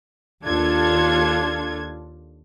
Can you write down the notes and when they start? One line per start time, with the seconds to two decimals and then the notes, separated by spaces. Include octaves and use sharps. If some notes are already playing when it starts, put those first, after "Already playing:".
0.45 D#2 D4 F4 A4 G#6